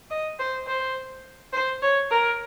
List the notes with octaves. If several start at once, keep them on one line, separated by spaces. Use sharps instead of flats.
D#5
C5
C5
C5
C#5
A#4